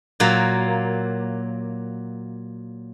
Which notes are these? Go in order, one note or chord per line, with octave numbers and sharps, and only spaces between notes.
A#2 F#3 A#3